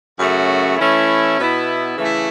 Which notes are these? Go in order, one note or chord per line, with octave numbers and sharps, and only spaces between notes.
F#2 C#3 A3 F#4
E3 A3 C#4 E4
B2 B3 E4
C#3 E3 A3 E4